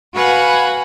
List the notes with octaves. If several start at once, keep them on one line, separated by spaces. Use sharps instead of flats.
F#4 B4 F5 F#5 G#5 B5